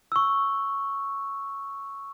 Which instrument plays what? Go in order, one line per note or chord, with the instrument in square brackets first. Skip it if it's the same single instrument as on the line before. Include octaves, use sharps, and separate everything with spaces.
[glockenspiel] C#6 E6